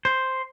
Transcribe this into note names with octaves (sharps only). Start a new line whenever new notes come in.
C5